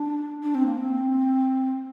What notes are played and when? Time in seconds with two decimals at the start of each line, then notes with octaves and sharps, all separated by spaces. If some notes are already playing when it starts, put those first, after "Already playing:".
Already playing: D4
0.43 D4
0.55 C4
0.66 A#3
0.78 C4